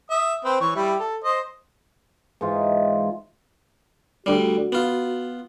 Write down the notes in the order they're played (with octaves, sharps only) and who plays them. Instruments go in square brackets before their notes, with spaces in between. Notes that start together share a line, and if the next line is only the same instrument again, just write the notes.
[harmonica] E5 D#6
C4 B4 C5
E3 C#5 C#6
G3 E4 G4
A4
C5 D#5
[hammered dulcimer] G#2 E3 D#4 F4
[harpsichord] D2 G3 [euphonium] F#4
[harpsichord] B3 F4